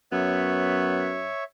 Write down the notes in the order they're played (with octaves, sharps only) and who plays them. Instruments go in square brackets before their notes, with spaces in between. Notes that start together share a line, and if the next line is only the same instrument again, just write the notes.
[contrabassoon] F#2 [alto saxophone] B3 [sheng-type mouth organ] C#5 E5 C#6